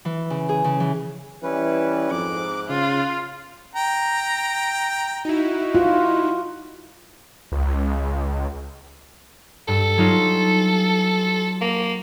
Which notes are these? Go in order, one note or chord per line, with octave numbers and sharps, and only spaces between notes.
E3
C#3
G#4
C#3
E3
E3 G3 C#4 E4 B4
F2 G#2 D6 F#6
C#3 F4
G5 A#5
D#4 E4 F#4
F4
C#2
G2 A4
F#3 D#4 F4
A#3